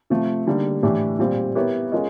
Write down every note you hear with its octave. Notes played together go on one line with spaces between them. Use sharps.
C3 F3 A3
D3 G3 A#3 D#4
A2 E3 A3 D4 G4
A#2 G3 C4 F4
B3 E4 G4 A#4 C#5
G#3 C#4 F4 A#4 D#5